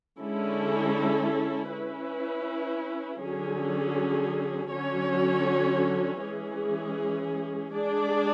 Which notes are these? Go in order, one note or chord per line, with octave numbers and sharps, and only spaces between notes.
D3 G#3 C#4 E4 A4
C#4 E4 B4
D3 F#3 C#4 G#4
D3 F#3 C#4 F#4 C#5
E3 G#3 C#4 G#4
G#3 D4 G#4 D5